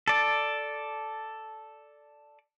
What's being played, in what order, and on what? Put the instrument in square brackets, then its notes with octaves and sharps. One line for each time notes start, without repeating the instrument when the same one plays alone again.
[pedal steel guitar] A4 D5